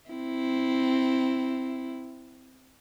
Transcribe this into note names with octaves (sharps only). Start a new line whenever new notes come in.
C4 E4